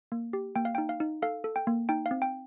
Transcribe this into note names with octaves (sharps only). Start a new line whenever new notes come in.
A#3
G4
A#3 G5
F5
D#4 G5
F5
D#4
A4 F5
A4
G5
A#3
D#4 G5
F5
C4
G5